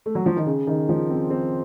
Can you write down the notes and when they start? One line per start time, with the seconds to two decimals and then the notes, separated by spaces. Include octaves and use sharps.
0.06 A3
0.15 F#3
0.26 F3
0.36 D#3
0.46 C#3
0.67 D#3
0.89 F3
1.10 C4
1.30 C4